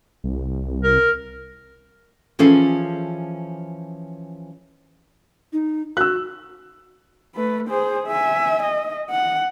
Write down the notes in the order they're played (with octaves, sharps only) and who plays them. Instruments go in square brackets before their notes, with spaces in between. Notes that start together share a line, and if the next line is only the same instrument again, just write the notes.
[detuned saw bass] C2
[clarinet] A#4
[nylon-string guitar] E3 F3 C#4 G#4 A4 E5
[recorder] D#4
[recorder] F#4 [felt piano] E6 F#6
[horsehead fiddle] A3 B4
G#4 C5
E5 G#5
D#5
F#5